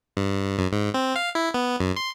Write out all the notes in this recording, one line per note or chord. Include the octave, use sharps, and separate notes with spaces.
G2
F#2
G#2
C4
F5
E4
B3
F#2
C6